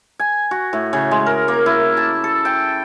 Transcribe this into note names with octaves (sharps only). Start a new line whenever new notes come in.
G#5
F#4
A2
C#3
G#3
A#4
A#3
E4
A5
A4
G5